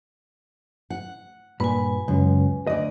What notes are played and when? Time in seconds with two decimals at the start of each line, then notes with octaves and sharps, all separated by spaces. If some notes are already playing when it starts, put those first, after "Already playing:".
0.90 F#5
1.60 G2 A#2 B4 G#5 B5
2.08 C#2 F#2
2.67 D2 D5 D#5